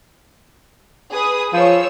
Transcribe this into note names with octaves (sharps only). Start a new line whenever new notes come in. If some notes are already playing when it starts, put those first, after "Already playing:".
G#4 B4 D#6
F3 C#5 E6